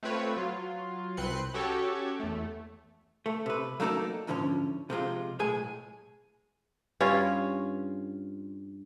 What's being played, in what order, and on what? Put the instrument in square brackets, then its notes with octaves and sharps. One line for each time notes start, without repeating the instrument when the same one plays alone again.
[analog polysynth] A3 C4 F4 B4 C#5
F#3 F4
C2 C4 B4 C6 F#6 C#7
C#4 F#4 G4 A4 C#5
E2 A3
[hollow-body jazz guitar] A3
C3 B4
F#3 A3 A#3 D#4 A4 D5
E2 G#2 D3 F3 C#4
C3 F3 G#3 F4
B1 A2 G#3 G#4 G#5
[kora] G2 C#4 F4